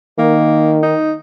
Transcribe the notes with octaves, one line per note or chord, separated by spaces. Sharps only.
D#3 A#3
D#4